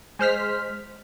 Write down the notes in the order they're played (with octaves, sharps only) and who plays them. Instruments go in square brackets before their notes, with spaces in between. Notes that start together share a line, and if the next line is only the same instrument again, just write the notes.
[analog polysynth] G#3 C5 F6 B6